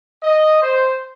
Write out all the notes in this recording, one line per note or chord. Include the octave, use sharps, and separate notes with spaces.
D#5
C5